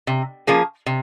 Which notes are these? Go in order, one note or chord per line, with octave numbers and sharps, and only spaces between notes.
C3
F3 A#3 C#4 G#4
C3